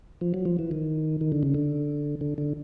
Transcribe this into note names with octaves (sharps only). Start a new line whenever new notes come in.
F3
F#3
F3
E3
D#3
D#3
D3
C#3
D3
D3
D3